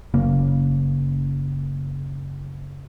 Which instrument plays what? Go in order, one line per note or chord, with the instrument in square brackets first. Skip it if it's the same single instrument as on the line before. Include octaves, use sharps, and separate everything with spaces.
[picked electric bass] F#1 C#3 A#3